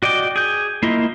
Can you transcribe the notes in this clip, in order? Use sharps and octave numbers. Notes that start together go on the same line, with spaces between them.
F#4 D5 D#5 G5 D6
G#4 G6
A#3 E4 F4 D#5